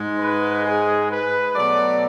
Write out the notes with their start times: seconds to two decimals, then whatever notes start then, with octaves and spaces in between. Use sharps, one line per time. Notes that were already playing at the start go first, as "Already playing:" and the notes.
Already playing: G#2 G#3
0.18 B4
0.64 G#4
1.09 B4
1.55 B2 F#3 A3 D5